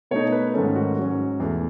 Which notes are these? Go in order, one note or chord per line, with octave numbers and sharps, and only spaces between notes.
B2 A3 D#4 C#5
B4
G#2 D#3 A3 C#4 A4
F#4
G#2 F#3 C#4
E2 B2 A3